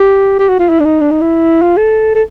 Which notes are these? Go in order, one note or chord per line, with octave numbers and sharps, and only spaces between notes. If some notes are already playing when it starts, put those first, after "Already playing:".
Already playing: G4
G4
F#4
F4
E4
D4
D#4
D4
D#4
E4
F4
A4
A4